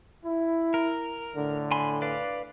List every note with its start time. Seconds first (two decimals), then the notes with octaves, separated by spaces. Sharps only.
0.25 E4
0.74 A#4
1.36 A2 D3
1.71 G#5 B5 C6
2.02 B4 D5 F5